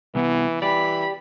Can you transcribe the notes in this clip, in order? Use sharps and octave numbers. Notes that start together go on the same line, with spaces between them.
C2 E3 B3
E3 G4 D5 B5